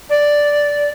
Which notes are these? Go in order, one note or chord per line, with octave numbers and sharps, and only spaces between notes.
D5